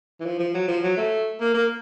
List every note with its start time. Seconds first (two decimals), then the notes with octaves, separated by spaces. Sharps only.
0.20 E3
0.25 F3
0.39 F3
0.54 F#3
0.68 F3
0.83 F#3
0.97 A3
1.40 A#3
1.54 A#3